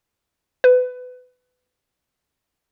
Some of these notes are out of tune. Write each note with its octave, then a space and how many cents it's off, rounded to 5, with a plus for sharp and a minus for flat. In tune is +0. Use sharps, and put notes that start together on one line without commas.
B4 +25